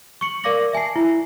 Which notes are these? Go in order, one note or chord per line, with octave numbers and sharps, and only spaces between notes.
C#6 C#7 F#7
A#4 D5 F5 D6 A#6 F#7
E5 G#5 A5 C7
E4